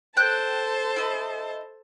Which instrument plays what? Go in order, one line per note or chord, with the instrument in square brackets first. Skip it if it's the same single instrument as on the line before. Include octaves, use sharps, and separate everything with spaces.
[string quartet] A4 C5 A5 [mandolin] G5 F#6
[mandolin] E4 D#5